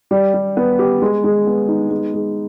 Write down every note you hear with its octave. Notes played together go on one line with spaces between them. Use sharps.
G3
G3
B3
G4
G#3
G#3
B3
D#4
G#3
G#3